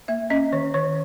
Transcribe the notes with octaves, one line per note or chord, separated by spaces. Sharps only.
A#3 E5
C#4 D#5
D#3 C#5
D#3 C#5